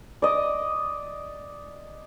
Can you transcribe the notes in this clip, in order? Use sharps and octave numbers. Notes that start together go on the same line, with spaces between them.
D5 D#5